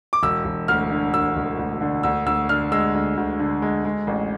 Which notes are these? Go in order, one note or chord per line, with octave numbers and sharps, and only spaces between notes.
D6
E1 E6
E1
D2 F6
D3
E1 E6
E1
D2
D3
D2 E6
D2 E6
D3 F6
G#3 E6
D2
D2
D3
G#3
G#3
A1